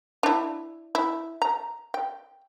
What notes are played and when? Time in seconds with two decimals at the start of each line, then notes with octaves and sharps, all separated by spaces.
0.23 D4 E4
0.95 E4
1.42 A#5
1.94 G5